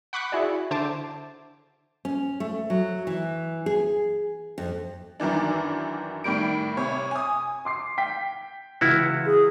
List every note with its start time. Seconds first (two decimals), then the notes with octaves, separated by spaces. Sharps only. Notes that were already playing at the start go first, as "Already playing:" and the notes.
0.13 F#5 B5 C#6 D6 F#6
0.32 E4 F#4 G#4 D5
0.71 D3 C5 E5 A5 D6
2.05 C#4
2.40 A3
2.70 F#3
3.07 E3
3.66 G#4
4.58 F2
5.20 F#2 D#3 E3 D4
6.24 A2 D#3 G3 D7
6.77 C3 C#5
7.11 G#5 D#6
7.65 C6 D6 C7
7.98 G5 B6
8.81 C#2 E3 E4 F#4 F6
9.26 G#4